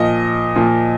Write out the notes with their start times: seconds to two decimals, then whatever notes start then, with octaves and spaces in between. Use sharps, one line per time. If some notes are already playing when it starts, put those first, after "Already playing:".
Already playing: A#2 F3 D#5
0.56 A#2 F3